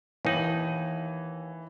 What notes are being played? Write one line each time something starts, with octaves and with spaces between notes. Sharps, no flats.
D#2 E3 D#4 F#7